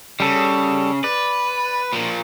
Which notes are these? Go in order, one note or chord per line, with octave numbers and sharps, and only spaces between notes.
C#3 G3 A4
B4 D5
A#2 F3